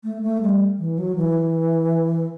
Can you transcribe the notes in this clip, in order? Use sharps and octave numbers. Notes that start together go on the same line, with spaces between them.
A3
A3
G3
E3
F#3
E3